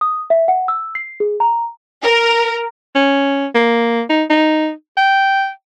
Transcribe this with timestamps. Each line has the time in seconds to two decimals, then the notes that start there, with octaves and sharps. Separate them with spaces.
0.01 D#6
0.30 E5
0.48 F#5
0.68 E6
0.95 C7
1.20 G#4
1.40 A#5
2.02 A#4
2.95 C#4
3.55 A#3
4.10 D#4
4.30 D#4
4.97 G5